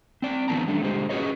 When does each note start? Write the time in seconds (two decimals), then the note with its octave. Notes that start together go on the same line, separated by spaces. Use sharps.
0.22 C4 D5
0.48 D3 E3 B3 A5 A#5
0.67 G3 A3 D4
0.81 D3 G#3 G4 C5
1.09 C#4 F#4 G#4 B4 C#5 D#5